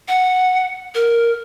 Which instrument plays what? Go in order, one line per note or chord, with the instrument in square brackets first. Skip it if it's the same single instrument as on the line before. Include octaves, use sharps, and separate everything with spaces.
[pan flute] F#5
A#4